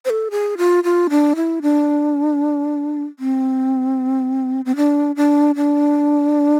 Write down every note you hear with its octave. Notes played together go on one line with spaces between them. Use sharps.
C5
A4
G#4
F4
F4
D4
E4
D4
C4
C4
D4
D4
D4